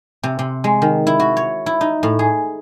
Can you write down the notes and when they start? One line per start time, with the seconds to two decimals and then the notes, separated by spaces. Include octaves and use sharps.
0.23 C3
0.39 C3
0.64 G#3
0.82 D#3
1.07 E4
1.20 F#4
1.37 C#5
1.66 E4
1.81 D#4
2.03 A2
2.19 G#4